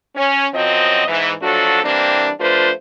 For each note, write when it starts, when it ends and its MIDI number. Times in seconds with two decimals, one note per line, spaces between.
0.16 0.47 61
0.54 1.03 42
0.54 1.03 53
0.54 1.03 54
0.54 1.03 60
0.54 1.03 75
1.08 1.33 44
1.08 1.33 52
1.42 1.82 53
1.42 1.82 54
1.42 1.82 57
1.42 1.82 62
1.42 1.82 66
1.42 1.82 69
1.84 2.30 52
1.84 2.30 55
1.84 2.30 58
1.84 2.30 60
1.84 2.30 62
2.40 2.71 53
2.40 2.71 57
2.40 2.71 62
2.40 2.71 65
2.40 2.71 71
2.40 2.71 72